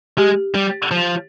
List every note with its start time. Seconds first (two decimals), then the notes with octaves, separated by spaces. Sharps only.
0.18 G#3 G4
0.55 G3
0.91 F3